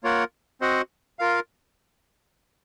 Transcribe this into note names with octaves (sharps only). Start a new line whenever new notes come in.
A#3 F4 A#4 C#5 F#5
C4 F#4 C5 D#5 F#5
F4 A#4 F5